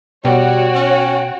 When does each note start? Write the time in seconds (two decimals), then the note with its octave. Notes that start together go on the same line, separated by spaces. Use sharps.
0.25 B2 G3 F#4 C#5 G5
0.75 C#4